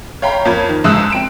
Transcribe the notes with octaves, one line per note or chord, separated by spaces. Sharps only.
C#5 F5 G5 A#5 B5
F2 A#3 C#4 F4 G#6
D#3
G1 C#2 G#3 D#6 E6 F#6
C4 D7 E7